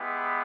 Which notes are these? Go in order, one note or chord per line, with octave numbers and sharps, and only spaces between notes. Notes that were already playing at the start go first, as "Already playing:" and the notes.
Already playing: G#3 B3 E4 G4